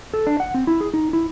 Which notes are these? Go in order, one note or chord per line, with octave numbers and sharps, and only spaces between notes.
A4
D4
F#5
C4
E4
G#4
D#4
E4